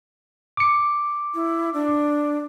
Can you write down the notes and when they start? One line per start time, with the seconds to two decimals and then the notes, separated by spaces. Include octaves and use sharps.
0.57 D6 C#7
1.34 E4
1.74 D4